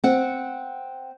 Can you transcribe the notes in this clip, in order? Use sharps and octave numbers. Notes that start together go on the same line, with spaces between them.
C4 F#5